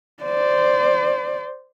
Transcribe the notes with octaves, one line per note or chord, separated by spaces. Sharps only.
C5 D5